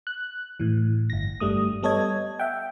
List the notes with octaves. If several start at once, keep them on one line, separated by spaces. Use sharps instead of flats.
F#6
A2 E3
G1 A#6
G2 G3 A3 D#6
G3 B3 A4 C#5 D#5 G#6
E5 F#5 G5